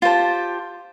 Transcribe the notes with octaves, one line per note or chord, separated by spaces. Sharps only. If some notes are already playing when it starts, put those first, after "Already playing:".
F4 G4 C5 A5